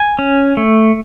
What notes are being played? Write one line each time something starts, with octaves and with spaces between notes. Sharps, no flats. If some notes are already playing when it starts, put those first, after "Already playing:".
Already playing: G#5
C#4
A3